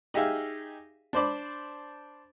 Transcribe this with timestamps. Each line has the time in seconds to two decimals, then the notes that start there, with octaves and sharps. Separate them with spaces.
0.14 D#4 G4 G#4 E5 F5
1.13 D4 C5 D5 B5